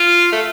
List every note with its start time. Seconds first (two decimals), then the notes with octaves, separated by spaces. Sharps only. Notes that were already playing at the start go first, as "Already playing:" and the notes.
Already playing: F4
0.32 A3